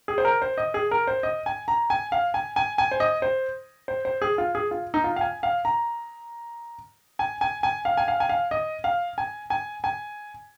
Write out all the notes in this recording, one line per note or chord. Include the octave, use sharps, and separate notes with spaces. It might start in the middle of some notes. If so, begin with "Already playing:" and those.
G#4
C5
A#4
C5
D#5
G#4
A#4
C5
D#5
G#5
A#5
G#5
F5
G#5
G#5
G#5
C5
D#5
C5
C5
C5
G#4
F4
G#4
F4
D#4
F4
F5
G#5
F5
A#5
G#5
G#5
G#5
F5
G#5
F5
G#5
F5
D#5
F5
G#5
G#5
G#5